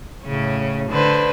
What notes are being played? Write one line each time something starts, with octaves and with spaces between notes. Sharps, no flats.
A2 C#3 C#4
D3 B4 C5